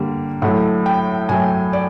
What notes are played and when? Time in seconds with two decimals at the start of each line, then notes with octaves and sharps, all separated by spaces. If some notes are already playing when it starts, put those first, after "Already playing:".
Already playing: D3 G3 A#3
0.42 A2 F#3 A3 F#5
0.86 G5
1.29 A2 F#3 A3 G#5
1.73 D5